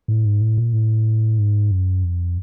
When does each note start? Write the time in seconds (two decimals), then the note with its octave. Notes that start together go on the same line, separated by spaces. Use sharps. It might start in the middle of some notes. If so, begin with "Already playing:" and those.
0.08 A2
0.25 G#2
0.41 A2
0.58 A#2
0.73 A2
1.38 G#2
1.71 F#2
2.04 F2